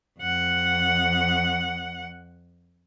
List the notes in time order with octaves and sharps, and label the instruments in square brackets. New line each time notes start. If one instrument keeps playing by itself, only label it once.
[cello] F2 F#5